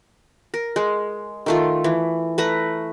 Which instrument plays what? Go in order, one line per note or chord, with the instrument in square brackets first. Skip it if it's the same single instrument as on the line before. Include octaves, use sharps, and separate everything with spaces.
[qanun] A#4
G#3
D#3 A3 F4
E3
A3 B4 A#5